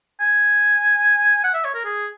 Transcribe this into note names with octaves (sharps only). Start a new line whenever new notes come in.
G#5
F#5
E5
C#5
A#4
G#4